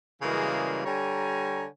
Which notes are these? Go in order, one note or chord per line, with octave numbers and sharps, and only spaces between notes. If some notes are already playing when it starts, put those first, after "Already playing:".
F#2 C#3 E3 G3 G#3 A#3
D3 G3 C#5 G#5 A#5